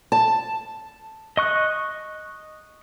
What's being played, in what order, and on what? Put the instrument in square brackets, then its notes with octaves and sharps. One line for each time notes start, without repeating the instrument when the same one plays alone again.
[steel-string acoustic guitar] A5
[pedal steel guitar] D#5 C#6 F#6